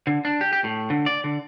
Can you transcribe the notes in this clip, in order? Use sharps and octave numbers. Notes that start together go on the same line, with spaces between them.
D3
D4
G4
G4
A2
D3
D5
D3